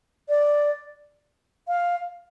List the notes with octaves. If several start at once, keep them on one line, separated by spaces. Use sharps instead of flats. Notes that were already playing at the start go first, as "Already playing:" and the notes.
D5
F5